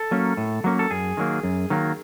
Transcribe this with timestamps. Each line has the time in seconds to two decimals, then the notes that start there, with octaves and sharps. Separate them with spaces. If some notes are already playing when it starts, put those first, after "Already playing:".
Already playing: A4
0.11 F#3 A#3 C#4
0.37 A2
0.64 F#3 A#3 C#4
0.79 A4
0.91 F#2 G#4
1.17 D#3 F#3 A#3
1.44 F#2
1.70 D#3 F#3 A#3